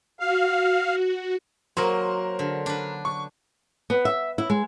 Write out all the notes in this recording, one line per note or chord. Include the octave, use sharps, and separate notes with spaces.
F#4 F5
F#3 A#3 A#4 C5
D3
D4 B4
C#6
B3
E5
E4
G#3